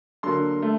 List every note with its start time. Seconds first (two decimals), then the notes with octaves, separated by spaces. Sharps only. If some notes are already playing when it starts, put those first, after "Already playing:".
0.23 D3 F#3 A#3 C6
0.62 A3